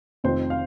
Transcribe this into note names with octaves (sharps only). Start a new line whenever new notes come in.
F1 F2 D#3 C4 F4 C5
F5